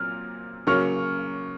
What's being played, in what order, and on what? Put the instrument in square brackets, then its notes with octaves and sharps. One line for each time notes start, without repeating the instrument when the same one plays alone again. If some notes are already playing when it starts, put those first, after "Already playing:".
Already playing: [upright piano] A#2 F#3 C4 [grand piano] F6
[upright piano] C#3 F#3 A#3 [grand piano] C#6 F6